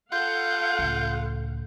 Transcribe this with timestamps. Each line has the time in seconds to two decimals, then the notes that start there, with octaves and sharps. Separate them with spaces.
0.12 F4 A4 F5 F#5 G6
0.79 C#2 A2